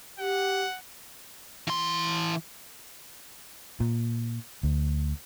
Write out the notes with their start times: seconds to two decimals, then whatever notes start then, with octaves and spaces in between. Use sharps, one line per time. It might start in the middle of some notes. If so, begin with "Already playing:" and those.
0.19 G4 F#5
1.67 E3 C6
3.80 A#2
4.63 D2